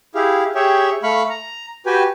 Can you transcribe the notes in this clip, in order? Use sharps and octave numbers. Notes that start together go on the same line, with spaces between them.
E4 G4 G#4 F5
G4 G#4 C#5 E5 G5
A3 F5 B5 C#6
A#5
F#4 G4 B4 G5 G#5